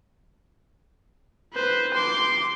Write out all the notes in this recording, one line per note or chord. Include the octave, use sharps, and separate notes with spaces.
B4 C5
C6 D6